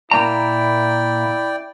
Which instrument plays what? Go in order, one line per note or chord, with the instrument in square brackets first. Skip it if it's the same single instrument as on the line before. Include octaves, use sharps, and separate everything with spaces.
[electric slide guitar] A#2 A#3 A#5 [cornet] E4 [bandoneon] D5 G5